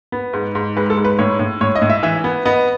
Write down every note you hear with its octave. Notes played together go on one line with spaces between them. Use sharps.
B3
G#2
G#2
G#3 B4
A4
G#2
B4
A2 C#5
A2
A2 C#5
D#5
A2
E5
E3 E5
B3
B3 D#5